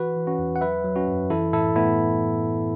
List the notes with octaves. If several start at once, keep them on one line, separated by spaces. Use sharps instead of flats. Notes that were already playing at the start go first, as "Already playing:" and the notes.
Already playing: E3 F#4 B4
E3
C#4 F#4
E2
F#5
F#3 B4 E5
F#3
C#4 F#4
F#2
E3 E4 A4
A2 E4 A4
A2 B3 E4